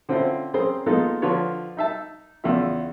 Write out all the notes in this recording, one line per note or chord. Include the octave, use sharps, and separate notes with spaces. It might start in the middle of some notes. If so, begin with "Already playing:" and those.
D3 C4 C#4 E4 F4 C5
C4 C#4 G#4 A#4 C5
G#3 A#3 B3 D#4 F4 A4
D3 F3 F4 B4 C#5
D#4 E5 A5
E2 C#3 F4 E5